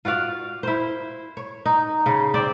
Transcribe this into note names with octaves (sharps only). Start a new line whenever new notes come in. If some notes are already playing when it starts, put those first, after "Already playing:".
F4 F#4 D5 F5
E4 C5
C#5
D#4
C#3
C4 C5 D5